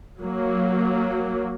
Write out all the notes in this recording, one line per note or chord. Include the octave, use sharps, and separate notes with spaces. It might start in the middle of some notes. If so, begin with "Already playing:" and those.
F#3 A#3